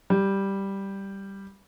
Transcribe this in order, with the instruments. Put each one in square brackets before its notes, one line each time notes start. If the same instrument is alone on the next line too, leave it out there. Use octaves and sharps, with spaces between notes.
[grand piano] G3